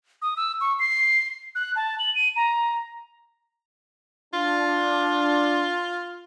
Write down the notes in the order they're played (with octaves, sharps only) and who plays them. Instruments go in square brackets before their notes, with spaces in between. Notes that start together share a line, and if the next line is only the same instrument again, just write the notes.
[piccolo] D#6
E6
C#6
C7
F#6
A5
F#7
D#7
A#5
[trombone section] D4 [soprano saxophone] F4